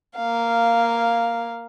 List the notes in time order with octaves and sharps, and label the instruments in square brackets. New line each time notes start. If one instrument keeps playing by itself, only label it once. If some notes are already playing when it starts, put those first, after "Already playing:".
[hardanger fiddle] A#3 F5